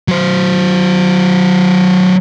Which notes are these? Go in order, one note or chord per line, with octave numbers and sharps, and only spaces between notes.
F#3 C5